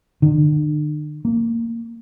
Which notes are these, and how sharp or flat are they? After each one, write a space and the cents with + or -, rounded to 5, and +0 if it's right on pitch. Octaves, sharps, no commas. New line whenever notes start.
D3 +45
A#3 -15